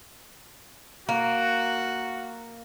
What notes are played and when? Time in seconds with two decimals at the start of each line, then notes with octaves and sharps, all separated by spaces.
1.09 A#3 F#4